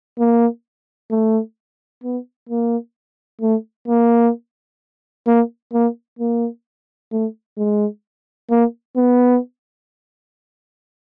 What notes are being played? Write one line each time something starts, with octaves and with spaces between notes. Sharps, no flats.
A#3
A3
B3
A#3
A3
A#3
A#3
A#3
A#3
A3
G#3
A#3
B3